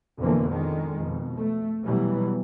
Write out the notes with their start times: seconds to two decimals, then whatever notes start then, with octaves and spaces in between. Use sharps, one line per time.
0.18 F2 B2 D3 E3 F3 A#3
0.49 D3 D#3 G#3
0.98 F2 B2
1.36 A3
1.84 B2 E3 F#3 G3 B3